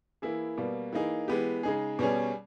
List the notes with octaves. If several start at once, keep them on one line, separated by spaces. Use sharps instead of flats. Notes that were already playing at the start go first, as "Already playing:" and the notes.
E3 A#3 E4 G#4
B2 G3 A#3
E3 A#3 D#4 G#4
E3 G#3 B3 G4
C#3 G#3 D#4 G#4
B2 G3 C#4 G#4